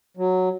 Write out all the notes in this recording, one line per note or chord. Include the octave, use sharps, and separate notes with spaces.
F#3